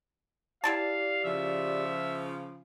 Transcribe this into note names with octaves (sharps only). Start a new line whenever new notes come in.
G3 E4 G4 D5 F5 A5
C#3 F3 E5